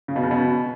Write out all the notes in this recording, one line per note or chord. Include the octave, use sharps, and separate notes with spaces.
C#3
B2
C#3
B2